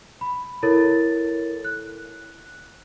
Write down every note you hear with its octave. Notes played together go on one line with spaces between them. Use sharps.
B5
E4 A4 A#4 C#5 A6
F#6